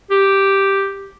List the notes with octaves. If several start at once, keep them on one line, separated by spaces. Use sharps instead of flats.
G4